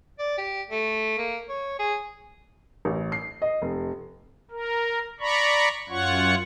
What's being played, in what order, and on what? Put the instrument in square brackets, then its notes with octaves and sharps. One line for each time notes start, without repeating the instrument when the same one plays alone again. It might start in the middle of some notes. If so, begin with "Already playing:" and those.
[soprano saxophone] D5
G4
A3
A#3
C#5
G#4
[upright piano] A1
C7
D#5
F1
[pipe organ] A#4
D5 A#5 B5 C#6
F#2 F4 C#5 F#5 C#6